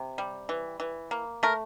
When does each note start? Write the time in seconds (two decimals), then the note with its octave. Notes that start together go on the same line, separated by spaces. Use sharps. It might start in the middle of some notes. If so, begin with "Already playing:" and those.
Already playing: C3
0.18 G3
0.49 E3
0.80 E3
1.11 A#3
1.43 A3 A#4